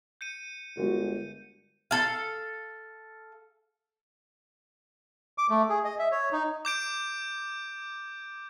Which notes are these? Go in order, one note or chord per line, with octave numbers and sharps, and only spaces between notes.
G6 C#7 D#7
G1 G#3 F#4 A#4
A4 F5
D6
A3
G#4
D#5
E5
C#5
D#4
D6 G6 D7